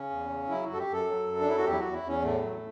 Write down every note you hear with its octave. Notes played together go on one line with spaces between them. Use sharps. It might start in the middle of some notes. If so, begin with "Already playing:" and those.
Already playing: C#3 C#4
E2
C#3
F#3 E4
F#2 F#4
A4
G4
F#2
A4
F#3
F#2
D4
F#3 E4
F#4
E2 G4
E4
E2 F#4
E4
E2
C#4
A2 A3
F#3